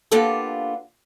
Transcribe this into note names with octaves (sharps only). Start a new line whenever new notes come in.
A#3 B3 D4 F4 G4 A4